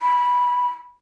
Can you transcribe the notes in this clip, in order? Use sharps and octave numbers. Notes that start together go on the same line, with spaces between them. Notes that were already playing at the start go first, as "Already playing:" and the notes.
B5